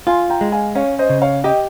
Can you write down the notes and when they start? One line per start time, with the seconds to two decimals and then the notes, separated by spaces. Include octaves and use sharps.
0.07 F4 G#5 C6
0.30 G5 A#5
0.41 G#3
0.52 F5 G#5
0.75 C#4 C#5 F5
0.99 C5 D#5
1.10 C#3
1.22 C#5 F5
1.44 G4 D#5 G5